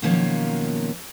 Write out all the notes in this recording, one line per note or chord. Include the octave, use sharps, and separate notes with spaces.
B2 D#3 F3 F#3 A#3 C#4